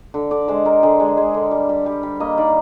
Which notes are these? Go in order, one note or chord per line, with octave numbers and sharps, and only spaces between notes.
D3
D3 D5
G#3 C5
G#3 A#4
D3 G#4
G#3
G#3
D3
G3
G3
G3
G3
A#3 D#5
D#3 D5